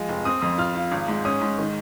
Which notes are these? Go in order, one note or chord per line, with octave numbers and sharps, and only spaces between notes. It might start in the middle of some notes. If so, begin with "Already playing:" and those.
Already playing: F3 G#3
F1
C4 D#6
F2 D#6
F4 F6
F4
G#1
G#2
C#4 D#6
G#2
D#3